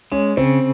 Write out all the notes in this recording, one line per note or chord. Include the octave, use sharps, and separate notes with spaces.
G#3 C#4
C#3 C4